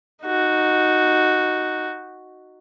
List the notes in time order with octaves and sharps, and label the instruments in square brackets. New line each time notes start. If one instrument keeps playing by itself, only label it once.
[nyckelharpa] D#4 F#4